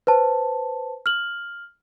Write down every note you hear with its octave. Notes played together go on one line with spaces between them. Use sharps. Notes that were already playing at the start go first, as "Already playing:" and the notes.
B4 C5 A5
F6 F#7